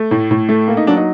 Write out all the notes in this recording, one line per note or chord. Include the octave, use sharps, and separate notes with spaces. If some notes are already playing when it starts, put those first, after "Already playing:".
Already playing: A3
A2
A2
A3
A#3
D#4
F#3 D4
D#4